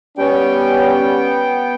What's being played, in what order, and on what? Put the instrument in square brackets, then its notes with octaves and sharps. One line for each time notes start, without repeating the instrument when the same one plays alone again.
[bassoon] G3 [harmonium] B3 G5 [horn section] C#4